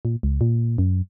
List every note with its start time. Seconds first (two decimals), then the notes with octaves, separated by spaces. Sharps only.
0.05 A#2
0.23 C#2
0.41 A#2
0.78 F#2